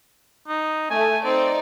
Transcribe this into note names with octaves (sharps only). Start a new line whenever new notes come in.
D#4
A3 G#5
C4 D#4 C5 D5